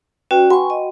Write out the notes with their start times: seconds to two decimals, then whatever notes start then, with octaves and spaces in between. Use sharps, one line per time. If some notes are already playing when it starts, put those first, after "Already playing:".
0.31 C#4 F#4 B4 D5 G5
0.50 F#4 F#5 G#5 B5 C#6
0.70 D#5